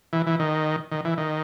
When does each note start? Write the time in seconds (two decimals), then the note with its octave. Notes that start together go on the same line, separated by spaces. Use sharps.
0.13 E3
0.26 E3
0.39 D#3
0.92 D#3
1.05 E3
1.18 D#3